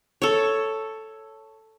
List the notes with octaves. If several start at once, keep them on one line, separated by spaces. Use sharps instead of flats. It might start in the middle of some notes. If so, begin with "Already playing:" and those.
A4 C#5